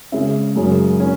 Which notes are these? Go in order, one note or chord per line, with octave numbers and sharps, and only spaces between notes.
C#3 G#3 C#4 E5
F#2 C#3 G#3 C#4
C#4